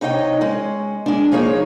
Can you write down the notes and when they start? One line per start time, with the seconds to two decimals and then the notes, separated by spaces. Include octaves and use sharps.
0.01 C3 D#4 C#5 D#5 F5 G5
0.41 G#3 C#4
1.06 G#3 D4
1.32 F3 A#3 D#4 G#4 C#5